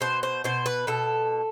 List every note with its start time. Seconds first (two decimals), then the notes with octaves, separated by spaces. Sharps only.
0.01 B2 C5
0.23 C5
0.44 B2 C5
0.66 B4
0.87 B2 A4